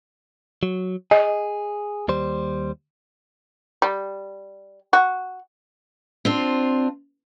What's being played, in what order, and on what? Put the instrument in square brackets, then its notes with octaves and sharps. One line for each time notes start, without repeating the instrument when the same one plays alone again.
[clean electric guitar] F#3
[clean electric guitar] G#4 [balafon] D#5
[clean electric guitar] D#2 G3 C5
[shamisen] G3
F#4
[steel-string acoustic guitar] C4 D4 F4